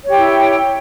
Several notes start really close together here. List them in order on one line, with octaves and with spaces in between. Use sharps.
C#5 G4 G5 E4